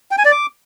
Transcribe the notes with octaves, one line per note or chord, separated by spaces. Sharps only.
G5
G#5
D5
D6